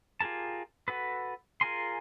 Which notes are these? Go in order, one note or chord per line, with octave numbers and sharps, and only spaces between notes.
F4 G4 G#4 A#4 A5
F#4 A4 B4
F4 G#4 A#4 G#5 C6